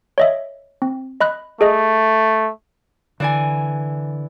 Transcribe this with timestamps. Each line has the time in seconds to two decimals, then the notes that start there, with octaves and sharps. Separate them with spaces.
0.18 C#5 D#5 E5
0.82 C4
1.21 D#5 B5 F#6
1.61 A3 G#4 D#5
3.20 D3 E3 D5 G#5